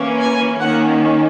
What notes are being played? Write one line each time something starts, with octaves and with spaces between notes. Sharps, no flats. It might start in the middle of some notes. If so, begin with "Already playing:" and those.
Already playing: E3 A#3 C#4
G#5
D#3 A#3 C#4 F#5